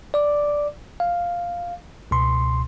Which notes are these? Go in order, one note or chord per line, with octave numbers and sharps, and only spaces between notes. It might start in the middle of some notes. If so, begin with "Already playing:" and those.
D5 D6
F5
C#2 B2 C6